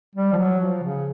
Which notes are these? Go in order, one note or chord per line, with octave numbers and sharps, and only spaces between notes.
G3
F3
F#3
F3
C#3